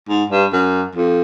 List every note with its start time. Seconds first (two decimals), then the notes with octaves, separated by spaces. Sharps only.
0.09 G#2
0.30 G2
0.53 F#2
0.95 F2